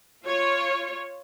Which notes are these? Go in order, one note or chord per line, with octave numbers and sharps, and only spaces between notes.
F4 C#5